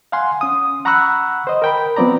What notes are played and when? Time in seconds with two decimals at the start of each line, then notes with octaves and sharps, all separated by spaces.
0.12 F5 F#5 G#5 C6
0.41 C#4 D#6
0.85 F#5 A#5 B5 C#6 E6 F#6
1.47 C5 D#5
1.62 A#4 G5 B5
1.96 F3 B3 C4 D5 A#5